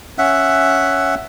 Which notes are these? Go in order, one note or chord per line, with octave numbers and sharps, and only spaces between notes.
C#4 E5 F#5